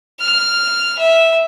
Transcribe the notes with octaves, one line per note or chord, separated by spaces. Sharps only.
F6
E5